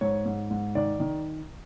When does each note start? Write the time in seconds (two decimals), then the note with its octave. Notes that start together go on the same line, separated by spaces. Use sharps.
0.01 G#2 C#5
0.26 G#2
0.51 G#2
0.75 D#3 D5
1.00 D#3